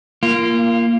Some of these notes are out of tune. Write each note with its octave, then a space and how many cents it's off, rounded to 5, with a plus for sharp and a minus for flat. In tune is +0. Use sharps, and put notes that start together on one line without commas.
A#3 +0 F4 -25